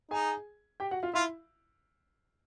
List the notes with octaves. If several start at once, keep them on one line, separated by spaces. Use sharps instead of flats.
D#4 G#4 G#5
G4 G5
F#4 F#5
F4 F5
E4 F4 E5